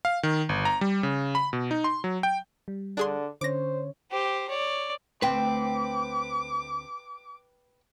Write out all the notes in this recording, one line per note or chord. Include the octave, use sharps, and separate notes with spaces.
F5
D#3
G1
A#5
G3
C#3
B5
B2
D#4
C6
F#3
G5
G3
D3 D4 G#4 C6
D3 C#4 C5 C#5 D6 A#6
G4 C5
C#5 D5
D2 C4 B4 G5 D6